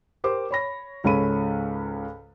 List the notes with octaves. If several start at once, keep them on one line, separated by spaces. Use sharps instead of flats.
G4 A#4 C5 D6
C#5 B5 A#6
C#2 G#2 C#4 A4 B5 D#7